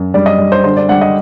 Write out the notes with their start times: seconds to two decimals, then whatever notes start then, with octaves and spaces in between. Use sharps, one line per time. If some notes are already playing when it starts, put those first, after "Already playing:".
Already playing: F#2
0.14 G3 D5
0.26 D#5
0.39 G3
0.52 C5
0.64 D3 C5
0.76 D5
0.88 G3 F#5
1.01 D#5